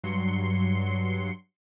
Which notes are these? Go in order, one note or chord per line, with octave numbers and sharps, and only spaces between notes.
G2 F#3 C6 C7 C#7